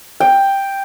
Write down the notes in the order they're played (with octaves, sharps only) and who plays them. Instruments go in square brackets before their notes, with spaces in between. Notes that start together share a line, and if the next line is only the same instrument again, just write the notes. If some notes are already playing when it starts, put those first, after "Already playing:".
[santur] G5